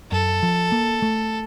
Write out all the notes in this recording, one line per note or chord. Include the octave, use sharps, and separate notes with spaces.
F#2 A4
F3
A#3
A3